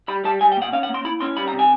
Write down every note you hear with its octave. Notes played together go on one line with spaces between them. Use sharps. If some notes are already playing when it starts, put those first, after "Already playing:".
G3 B5
G3 A5
G3 G#5
G5
A#2 F#5
C#4 F5
F#5
A#3
C6
E4 B5
C#4 C6
G3 B5
A#5
C3
G#5